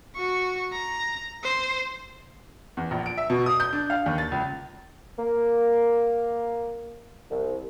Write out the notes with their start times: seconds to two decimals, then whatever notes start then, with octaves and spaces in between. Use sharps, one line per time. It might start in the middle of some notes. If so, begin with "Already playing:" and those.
0.15 F#4 C#6
0.73 A#5
1.44 C5
2.77 E2
2.91 A#1
3.06 D7
3.17 E5
3.30 B2
3.46 D#6
3.60 G6
3.73 D4
3.90 F5
4.06 D#2
4.18 A6
4.31 C#2
5.19 A#3
7.31 C2